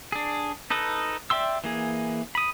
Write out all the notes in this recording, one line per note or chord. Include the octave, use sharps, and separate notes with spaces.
D4 G#4
D#4 A4 B4 D#5
D5 E5 G5 C6 E6
E3 A#3 G#4
B5 D#6